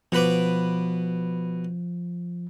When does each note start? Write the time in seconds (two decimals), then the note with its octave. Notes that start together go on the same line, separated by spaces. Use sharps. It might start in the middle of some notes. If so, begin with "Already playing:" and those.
0.12 B2 F3 B4 D6